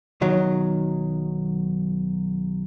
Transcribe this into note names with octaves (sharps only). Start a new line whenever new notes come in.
B1 D#3 F#3